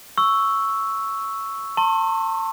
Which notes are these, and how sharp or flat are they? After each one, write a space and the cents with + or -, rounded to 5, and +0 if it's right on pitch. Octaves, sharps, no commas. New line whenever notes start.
C#6 +0 E6 +0
A5 +35 C6 +45